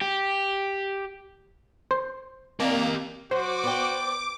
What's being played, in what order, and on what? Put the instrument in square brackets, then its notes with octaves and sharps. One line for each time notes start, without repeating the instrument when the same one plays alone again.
[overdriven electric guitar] G4
[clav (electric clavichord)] C5
[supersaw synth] A#3 [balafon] C4 D5 [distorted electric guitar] G4 D#5
[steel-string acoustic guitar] F#3 [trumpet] F#4 [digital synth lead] C5 [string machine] D6
[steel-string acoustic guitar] B3 D5 G5